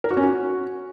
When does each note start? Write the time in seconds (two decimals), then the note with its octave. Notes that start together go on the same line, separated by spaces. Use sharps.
0.04 A#4
0.11 F#4
0.17 C#4
0.23 F#4